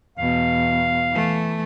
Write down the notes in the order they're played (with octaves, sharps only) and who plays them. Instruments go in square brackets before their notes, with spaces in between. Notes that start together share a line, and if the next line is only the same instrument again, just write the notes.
[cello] E2 B2 [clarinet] F5
[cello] E3 A3